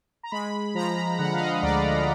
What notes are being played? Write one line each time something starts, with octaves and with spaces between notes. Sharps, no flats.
A#5
G#3 B5
F3 A#5
D3 F#5
F5
D#5
D2 D5